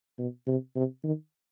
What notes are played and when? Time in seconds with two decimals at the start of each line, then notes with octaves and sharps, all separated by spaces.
0.19 B2
0.47 C3
0.76 C3
1.04 D#3